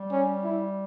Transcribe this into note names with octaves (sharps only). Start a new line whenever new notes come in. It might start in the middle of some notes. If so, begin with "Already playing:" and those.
Already playing: G3
C#4
E4